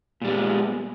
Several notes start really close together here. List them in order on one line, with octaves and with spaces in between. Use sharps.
A#2 G3 B3 G#3